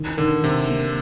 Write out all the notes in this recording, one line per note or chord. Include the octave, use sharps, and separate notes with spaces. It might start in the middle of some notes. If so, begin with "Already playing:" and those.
Already playing: D#3
D3 D#3
C3 D#3
A#3